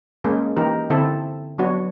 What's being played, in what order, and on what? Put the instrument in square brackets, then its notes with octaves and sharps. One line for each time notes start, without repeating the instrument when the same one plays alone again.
[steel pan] G#3 A#3 C#4 G#4
E3 A#3 D#4 G4 A#4
D3 C4 E4 A4
F#3 B3 D4 F#4 C#5